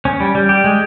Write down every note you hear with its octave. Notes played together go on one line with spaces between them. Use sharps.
C#4
G3
G3
G4
G#3